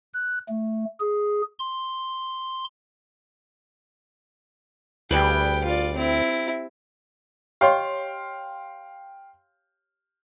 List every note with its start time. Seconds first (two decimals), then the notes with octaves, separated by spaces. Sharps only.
0.14 F#6
0.49 A3
1.00 G#4
1.59 C6
5.11 D2 G3 G#4 B4 G5
5.65 F4 D5
5.96 C4 E4
7.61 G4 C#5 D#5 F5 G5 C6